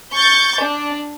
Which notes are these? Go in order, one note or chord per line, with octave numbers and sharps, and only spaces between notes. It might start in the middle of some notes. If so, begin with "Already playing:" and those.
C#6 G6 A6
D4